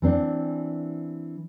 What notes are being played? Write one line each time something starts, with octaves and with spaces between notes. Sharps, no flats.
E3 C4 D4